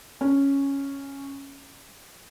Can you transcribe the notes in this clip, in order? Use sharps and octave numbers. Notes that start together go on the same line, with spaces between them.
C#4